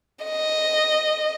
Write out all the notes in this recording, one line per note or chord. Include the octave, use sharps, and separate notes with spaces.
D#5